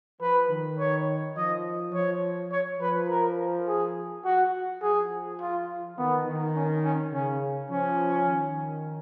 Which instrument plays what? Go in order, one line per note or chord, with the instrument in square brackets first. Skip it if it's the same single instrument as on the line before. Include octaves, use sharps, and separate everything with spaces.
[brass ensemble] F3 [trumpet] B4
[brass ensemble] D#3
[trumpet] C#5
[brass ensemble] F3 [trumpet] D#5
[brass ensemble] F3 [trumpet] C#5
[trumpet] C#5
[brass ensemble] F3 [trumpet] B4
[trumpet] A#4
G#4
F#4
[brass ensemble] F3 [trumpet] G#4
[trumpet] F4
[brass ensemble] D#3 [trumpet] B3
[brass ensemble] D#3
[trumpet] C#4
C#4
[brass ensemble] C#3 [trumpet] C#4
[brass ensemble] F3 [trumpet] C#4
[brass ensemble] D#3